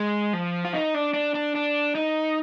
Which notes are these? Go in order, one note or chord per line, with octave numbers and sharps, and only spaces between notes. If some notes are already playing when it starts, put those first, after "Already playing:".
Already playing: G#3
F3
F4
D#4
D4
D4
D4
D4
D#4